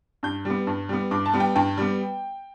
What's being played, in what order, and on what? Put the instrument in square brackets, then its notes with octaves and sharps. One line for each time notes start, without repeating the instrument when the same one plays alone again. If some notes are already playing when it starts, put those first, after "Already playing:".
[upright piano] G2 G6
G3 B3
G2
G3 B3
G2 D6
A5
G3 B3
G5
G2 G5
G3 B3